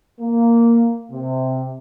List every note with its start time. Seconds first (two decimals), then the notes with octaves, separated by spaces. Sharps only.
0.21 A#3
1.12 C3